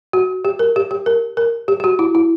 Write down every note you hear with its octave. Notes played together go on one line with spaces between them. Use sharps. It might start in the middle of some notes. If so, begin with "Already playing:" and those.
F#4
G4
A#4
G4
G4
A#4
A#4
G4
G4
F#4
E4
E4